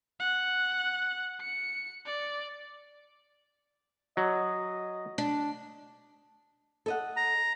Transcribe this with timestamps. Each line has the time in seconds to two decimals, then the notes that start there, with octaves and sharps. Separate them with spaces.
0.20 F#5
1.41 C#7
2.06 D5
4.17 F#3 D#5
5.18 D4
6.86 A4 D#5 F#5
7.17 A#5